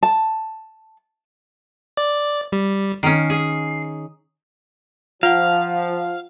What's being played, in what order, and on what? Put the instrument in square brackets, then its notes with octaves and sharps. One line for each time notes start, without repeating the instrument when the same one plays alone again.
[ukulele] A5
[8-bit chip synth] D5
G3
[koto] D#3 C#4 [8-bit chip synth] C7
[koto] G#4
[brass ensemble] F3 [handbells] F4 F#5 [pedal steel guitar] F5